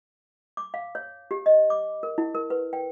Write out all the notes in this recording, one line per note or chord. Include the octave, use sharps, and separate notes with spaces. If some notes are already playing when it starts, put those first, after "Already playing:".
D6
F5
C#5
G4
D#5
D6
A#4
E4
A#4
B4
G5